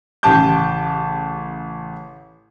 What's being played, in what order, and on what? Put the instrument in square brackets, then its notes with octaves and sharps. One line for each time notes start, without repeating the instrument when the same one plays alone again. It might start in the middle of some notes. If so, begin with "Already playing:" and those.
[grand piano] A1 C#3 G4 A5 D6 G6